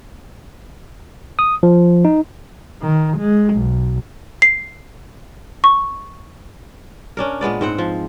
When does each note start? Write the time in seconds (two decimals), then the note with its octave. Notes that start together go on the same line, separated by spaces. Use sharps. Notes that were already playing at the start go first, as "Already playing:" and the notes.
1.39 D#6
1.63 F3
2.05 D#4
2.82 D#3
3.18 G#3
3.55 B1
4.42 C7
5.64 C#6
7.17 C#4 D4 A#4
7.41 A#2 G#3 B3 D5
7.61 G#2 C4 F#5
7.78 F3